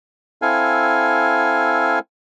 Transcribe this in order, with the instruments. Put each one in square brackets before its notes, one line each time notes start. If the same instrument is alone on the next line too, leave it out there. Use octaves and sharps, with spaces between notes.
[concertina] C4 E4 A4 F5 G#5